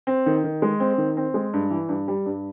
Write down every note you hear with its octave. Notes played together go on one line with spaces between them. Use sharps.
C4
D#3
D#3
G#3
C4
D#3
C4
G#3
G2
E3
G2
G3
G2